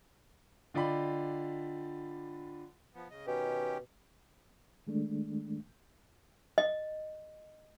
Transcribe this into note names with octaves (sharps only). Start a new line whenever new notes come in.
D3 F4 D5 D#5 G5 B5
F3 B3
C#3 D#5
B2 D#3 C#4 G4
D#3 G#3 A3 D4
D#5